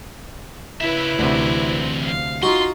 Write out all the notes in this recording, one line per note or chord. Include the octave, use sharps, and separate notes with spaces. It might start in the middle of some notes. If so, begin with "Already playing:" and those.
C#3 E4 B4 E5
D2 C3 E3 C4
F5
D#4 F4 F#4 C6